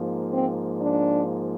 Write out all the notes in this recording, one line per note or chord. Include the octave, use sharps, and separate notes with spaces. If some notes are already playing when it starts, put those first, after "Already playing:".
Already playing: G#2 F3 A#3
C4
D4